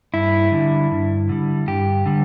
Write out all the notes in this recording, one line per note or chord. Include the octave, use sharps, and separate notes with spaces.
G2 E4
D3 G3
G2
D3 G3
G2 G4
D3 G3